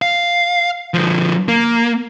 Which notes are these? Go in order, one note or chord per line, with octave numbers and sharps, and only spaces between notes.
F5
D3 F3
A#3